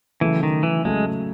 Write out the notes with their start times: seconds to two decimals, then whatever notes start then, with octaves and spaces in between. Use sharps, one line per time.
0.21 C#3 E3 F#3 A3
0.43 D#3
0.63 E3
0.85 C#3 F#3 G#3 A3